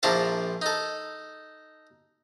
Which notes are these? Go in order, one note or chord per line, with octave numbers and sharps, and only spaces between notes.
A#1 F3 D4 E4 A#4 A5
D#4 A4